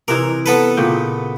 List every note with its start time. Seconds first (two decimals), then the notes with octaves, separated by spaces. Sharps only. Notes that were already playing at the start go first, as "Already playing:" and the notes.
0.08 C3 E3 D#4 A#4
0.46 B3 A4 B4
0.77 A#2 C#3 G5